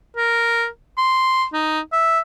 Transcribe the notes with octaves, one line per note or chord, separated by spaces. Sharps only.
A#4
C6
D#4
E5